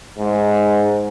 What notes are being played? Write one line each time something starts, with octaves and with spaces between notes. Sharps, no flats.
G#2